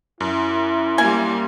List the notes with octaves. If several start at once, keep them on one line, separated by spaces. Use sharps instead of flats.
F#2 E4
G3 A#3 G#5